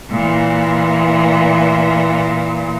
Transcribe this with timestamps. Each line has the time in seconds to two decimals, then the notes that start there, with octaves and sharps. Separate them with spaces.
0.10 A#2 E3